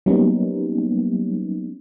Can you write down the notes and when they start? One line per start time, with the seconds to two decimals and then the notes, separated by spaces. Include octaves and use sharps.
0.06 F#3 G3 A#3 B3 C#4 D#4